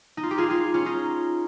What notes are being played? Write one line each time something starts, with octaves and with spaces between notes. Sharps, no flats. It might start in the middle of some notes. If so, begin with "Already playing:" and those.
D#4
F4
G4
F4 G#4
F4 G#4
C#4 F4
D#4